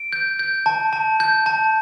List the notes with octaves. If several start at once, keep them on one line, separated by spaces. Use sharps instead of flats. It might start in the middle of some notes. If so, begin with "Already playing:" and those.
Already playing: D7
G6
G6
A5
A5
G6
A5